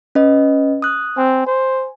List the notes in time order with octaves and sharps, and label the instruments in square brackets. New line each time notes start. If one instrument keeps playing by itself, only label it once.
[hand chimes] C#4 B4 D#5
D#6 F#6
[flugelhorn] C4 [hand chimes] G#5
[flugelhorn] C5